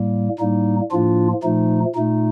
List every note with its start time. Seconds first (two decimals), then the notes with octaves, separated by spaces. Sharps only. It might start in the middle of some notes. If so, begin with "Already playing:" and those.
Already playing: A2 G3 A#3
0.39 A2 G3 A#3 D#4
0.91 A2 F3 A#3 D4 F4
1.43 A#2 F3 A3 D#4
1.95 A#2 A3 D#4